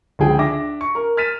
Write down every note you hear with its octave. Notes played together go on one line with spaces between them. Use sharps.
C#2 D3 F3 G#4 G5
D4 E5 D6 A#6
C#6
A#4
F6 A6 B6 D#7 E7